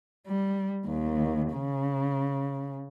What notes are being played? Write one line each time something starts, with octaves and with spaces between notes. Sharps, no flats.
G3
D#2
C#3